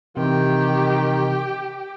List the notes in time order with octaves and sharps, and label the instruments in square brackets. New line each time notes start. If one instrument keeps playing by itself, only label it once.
[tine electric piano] C3 E3 [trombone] D#3 [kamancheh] G4